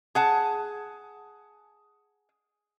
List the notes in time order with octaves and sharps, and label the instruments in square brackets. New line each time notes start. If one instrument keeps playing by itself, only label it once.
[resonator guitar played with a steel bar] G#4 F#5 A5